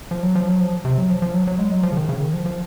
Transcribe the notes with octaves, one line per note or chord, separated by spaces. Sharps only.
F3
F#3
F3
F#3
F3
C3
F#3
F3
F3
F#3
F#3
G#3
F#3
F3
C#3
D#3
C#3
D#3
F3
F3